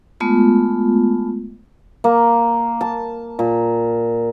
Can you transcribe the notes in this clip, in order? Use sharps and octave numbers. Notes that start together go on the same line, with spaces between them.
G#3 A3 B3 F4
A#3
A5
A#2